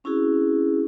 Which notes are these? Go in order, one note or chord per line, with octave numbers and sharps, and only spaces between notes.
C4 C#4 E4 F#4 G#4